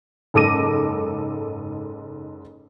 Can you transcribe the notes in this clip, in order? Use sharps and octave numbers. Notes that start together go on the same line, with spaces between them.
F#1 G#2 A4 D6 A#6 D#7